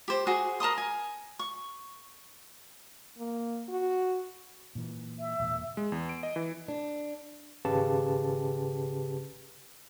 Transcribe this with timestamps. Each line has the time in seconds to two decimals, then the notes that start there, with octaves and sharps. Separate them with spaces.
0.08 G4 C5
0.27 F#4 G#4 C5 G#5
0.60 A#4 A5 C6 D#6
0.78 G#5
1.39 C#6
3.18 A#3
3.69 F#4
4.75 A#2 E3
5.20 E5
5.40 E1 A#2
5.77 G#3
5.92 E2
6.09 D7
6.23 D#5
6.36 E3
6.68 D4
7.65 G#1 C#3 G4 B4 A5